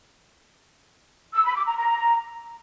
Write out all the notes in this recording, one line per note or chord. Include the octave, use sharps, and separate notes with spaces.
E6
B5
D6
A#5
A#5